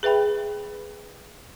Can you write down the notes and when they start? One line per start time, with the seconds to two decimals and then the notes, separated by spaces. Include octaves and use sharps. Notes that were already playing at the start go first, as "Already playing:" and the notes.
0.03 G#4 B4 E5 G5 B5